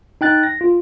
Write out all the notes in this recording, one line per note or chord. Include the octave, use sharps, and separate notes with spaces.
D#4 G5 F#6 A6
A#6
F4